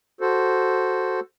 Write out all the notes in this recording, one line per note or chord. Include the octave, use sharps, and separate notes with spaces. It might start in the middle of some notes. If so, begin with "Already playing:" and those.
F#4 A4 C5